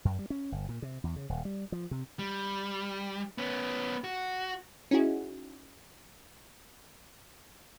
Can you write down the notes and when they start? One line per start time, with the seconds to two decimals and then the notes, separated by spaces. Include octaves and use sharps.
0.05 F#2
0.19 G3
0.30 C#4
0.52 G1
0.69 A#2
0.82 C3
1.04 E2
1.16 C#3
1.29 D#1
1.45 G3
1.72 F3
1.91 C3
2.19 G3
3.38 B3 C#4
4.04 F#4
4.91 C#4 D#4 E4 F#4 G#4